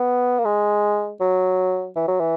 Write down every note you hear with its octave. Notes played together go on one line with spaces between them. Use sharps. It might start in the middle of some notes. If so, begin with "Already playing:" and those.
Already playing: B3
A#3
G#3
F#3
E3
F#3
E3